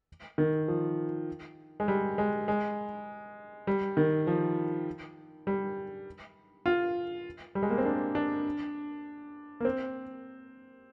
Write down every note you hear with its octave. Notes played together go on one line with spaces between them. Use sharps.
D#3
F3
G#3
G3
G#3
G#3
G3
D#3
F3
G3
F4
G3
G#3
A#3
C4
D4
D4
A#3
C4